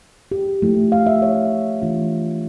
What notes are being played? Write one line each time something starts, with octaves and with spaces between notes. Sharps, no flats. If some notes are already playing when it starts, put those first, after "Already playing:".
G4
F3 A3 E4
F5
E5
C#5
E3 A3 D4 F4